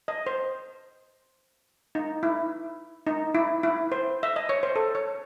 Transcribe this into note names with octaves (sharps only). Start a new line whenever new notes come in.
D#5
C5
D#4
E4
D#4
E4
E4
C5
E5
D#5
C#5
C5
A4
C#5